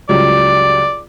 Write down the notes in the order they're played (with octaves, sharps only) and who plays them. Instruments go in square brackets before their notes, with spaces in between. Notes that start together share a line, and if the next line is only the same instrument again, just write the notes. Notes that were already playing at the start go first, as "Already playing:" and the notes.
[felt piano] C#2 F#3 G3 [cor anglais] D5